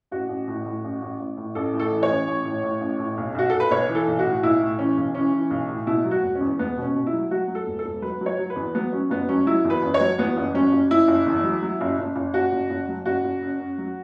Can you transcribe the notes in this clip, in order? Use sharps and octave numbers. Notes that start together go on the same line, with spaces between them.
A1 F#4
A1
A2
A2
A1
A1
A1
A2
A1 A4
A2
A4
E3
C#5
A1
A1
A2
A2
A1
A2
B1
B1 F#4
B1 A4
B4
B1 C#5
E3
A4
B1
F#4
A2
B1 E4
A2
E3 C#4
B1
E3 C#4
E3
B1
A2
B2 E4
F#3
F#4
E1
C#4
E2
E1 B3
B2 C#4
B2
E4
F#3
F#3 F#4
F#3
A4
E1
A4
E1
F#3 B4
F#3
C#5
F#3
B4
E2
F#3 B3
F#3 C#4
F#1 B3
F#3 C#4
F#3 E4
E2
B4
F#1
C#5
F#3
E2 B3
F#1
F#3 C#4
F#1
F#1 E4
F#1
E2
F#3
F#3
F#1
F#1
F#1
F#1 F#4
F#1
F#1
F#3
F#1 F#4
F#1
F#2
F#2
F#3